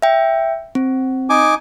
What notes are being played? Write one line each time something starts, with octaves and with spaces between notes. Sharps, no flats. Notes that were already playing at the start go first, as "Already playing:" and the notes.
E5 G5
C4
D#4 G#5 D6